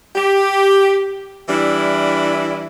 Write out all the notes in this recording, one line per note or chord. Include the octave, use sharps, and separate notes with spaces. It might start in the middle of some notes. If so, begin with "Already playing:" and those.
G4
E3 G3 D4 E4